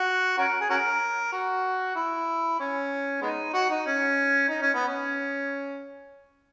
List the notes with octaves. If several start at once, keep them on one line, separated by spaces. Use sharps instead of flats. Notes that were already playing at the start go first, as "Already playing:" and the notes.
Already playing: F#4
C#4 F#4 A#4
G#4
C#4 F#4 A#4
F#4
E4
C#4
G#3 B3 D#4
F#4
D#4
C#4
D#4
C#4
B3
C#4